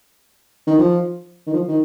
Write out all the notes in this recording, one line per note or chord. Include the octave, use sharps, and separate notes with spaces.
D#3
F3
D#3
F3
D#3